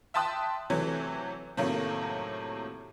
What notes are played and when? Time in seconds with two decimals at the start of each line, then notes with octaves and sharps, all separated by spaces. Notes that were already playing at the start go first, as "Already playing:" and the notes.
0.14 E5 G5 A5 C6 D#6 F#6
0.70 C3 E3 F#3 A3
1.57 A2 C3 D#3 F#3 A3 A#3